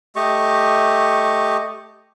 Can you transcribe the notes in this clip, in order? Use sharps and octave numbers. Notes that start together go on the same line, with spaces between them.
A3 G4 D#5 C#6